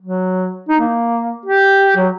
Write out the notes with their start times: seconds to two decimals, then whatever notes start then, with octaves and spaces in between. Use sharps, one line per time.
0.02 F#3
0.69 D#4
0.80 A#3
1.46 G4
1.96 F#3